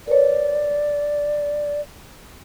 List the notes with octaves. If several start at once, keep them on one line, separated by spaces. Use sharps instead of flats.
A#4 B4 C#5 D5